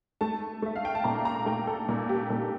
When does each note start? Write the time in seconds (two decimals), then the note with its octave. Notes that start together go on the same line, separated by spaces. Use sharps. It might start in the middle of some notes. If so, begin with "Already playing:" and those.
0.21 A3 A5
0.62 A3 E5
0.75 F5
0.85 G5
0.95 A5
1.04 A#2 A#5
1.25 A#5
1.46 A3 G5
1.67 A4
1.89 A#2
2.09 G4
2.30 A#2 A4